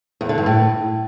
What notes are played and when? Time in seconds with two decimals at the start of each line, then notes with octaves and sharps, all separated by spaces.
0.21 E2
0.29 D3
0.38 G2
0.46 A2